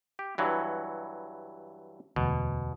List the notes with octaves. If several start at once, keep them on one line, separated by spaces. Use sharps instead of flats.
G4
G2 E3 F#3
E1 D2 B2